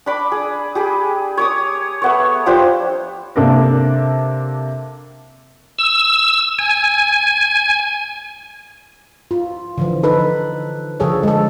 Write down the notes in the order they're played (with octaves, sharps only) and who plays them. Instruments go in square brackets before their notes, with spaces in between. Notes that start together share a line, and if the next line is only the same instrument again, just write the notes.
[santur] D4 B5 D6
G#4
G4 G#4 B5
C#5 D6 D#6
A3 B3 C#5
F3 D4 G4 C5
[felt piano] C3 A#3 D4 A4 A#4
[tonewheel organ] E6
G#5
[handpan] F4
D3 E3 F3
D#4 A4 B4
D3 F3 G#4 A4 C#5
G#3 A4